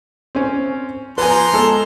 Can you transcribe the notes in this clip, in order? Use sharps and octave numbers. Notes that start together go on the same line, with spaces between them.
C4 C#4
F3 B4 G#5 A#5 C6
G#3 A4